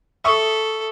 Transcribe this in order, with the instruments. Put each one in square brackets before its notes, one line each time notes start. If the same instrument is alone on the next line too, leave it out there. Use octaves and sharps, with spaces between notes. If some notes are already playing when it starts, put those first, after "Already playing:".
[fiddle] A4 [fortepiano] E5 C#6 D#6